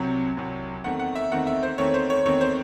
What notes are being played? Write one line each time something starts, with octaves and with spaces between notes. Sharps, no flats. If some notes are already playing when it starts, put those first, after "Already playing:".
Already playing: C2 C3 F#3
C2 C3 F#3
E2 D#3 A3 C4 F#5
F#5
E5
E2 D#3 A3 C4 F#5
E5
C5
E2 D#3 A3 C4 C#5
C5
C#5
E2 D#3 A3 C4 C#5
C5